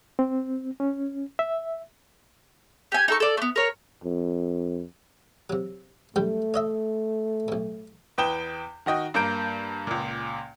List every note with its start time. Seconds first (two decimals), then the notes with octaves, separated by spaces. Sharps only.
0.19 C4
0.80 C#4
1.39 E5
2.92 G4 G#5
3.08 D#4 A4 C#6
3.20 A4 D5
3.37 A3 B3
3.56 A#4 C#5
4.04 F2
5.50 C3 F#3
6.16 F#2 G3 A3 G5
6.54 C#5 D#5 E5
7.48 B1 A2
8.18 E2 B4 G5 D#6 E7 G7
8.86 D#3 F#4 D#5 G5
9.14 G2 A#3 A#5 G6 D7
9.87 C#2 A#2